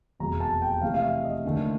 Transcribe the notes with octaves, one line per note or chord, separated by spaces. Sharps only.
F1 E2 B2 G#3 A#5
A5
G5
F2 C3 E3 A3 F5
F5
E5
D#5
D#2 D3 F3 A3